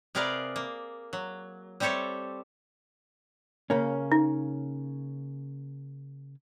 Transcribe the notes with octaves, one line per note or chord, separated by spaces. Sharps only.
C3 G#4 A#4 B4 D5 F5
A#3
F#3
G3 C4 G4 A4 C#5 E5
C#3 A#3 C#4
D#4